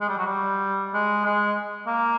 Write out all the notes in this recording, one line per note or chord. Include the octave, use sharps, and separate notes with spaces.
G#3
G3
F#3
G3
G#3
G#3
A#3